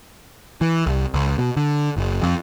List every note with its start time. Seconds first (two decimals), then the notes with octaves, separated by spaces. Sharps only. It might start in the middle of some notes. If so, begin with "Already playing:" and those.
0.61 E3
0.87 C2
1.14 C#2
1.38 B2
1.56 D3
1.97 F#1
2.22 F2